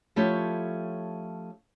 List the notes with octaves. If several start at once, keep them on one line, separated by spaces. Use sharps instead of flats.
F3 A3 C#4 E4 G4 C#5